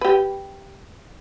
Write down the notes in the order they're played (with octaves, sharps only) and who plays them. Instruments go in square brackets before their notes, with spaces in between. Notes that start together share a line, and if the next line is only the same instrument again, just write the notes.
[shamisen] G4 B4